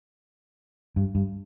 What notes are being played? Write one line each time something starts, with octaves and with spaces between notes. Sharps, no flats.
G2
G2